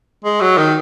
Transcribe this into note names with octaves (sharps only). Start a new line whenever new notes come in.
G#3
F#3
D#3